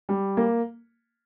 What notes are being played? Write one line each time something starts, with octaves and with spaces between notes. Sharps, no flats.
G3
A#3